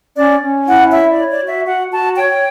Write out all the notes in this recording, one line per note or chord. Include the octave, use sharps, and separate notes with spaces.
C#4 D5
C#4
E4 F#5
C#5 E5
D5
C#5
D5
F#4
E5
F#4 F#5
F#4 A5
C#5 G5